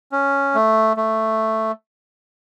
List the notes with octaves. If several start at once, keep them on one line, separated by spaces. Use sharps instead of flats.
C#4
A3
A3